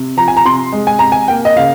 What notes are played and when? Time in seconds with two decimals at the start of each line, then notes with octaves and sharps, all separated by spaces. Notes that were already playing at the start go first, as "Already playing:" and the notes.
Already playing: C3
0.17 F3 A#5
0.28 G#5
0.37 A#5
0.45 C3 C6
0.72 G#3
0.87 G#5
0.99 C3 A#5
1.12 G#5
1.28 A#3 G5
1.45 D#5
1.56 C#3 F5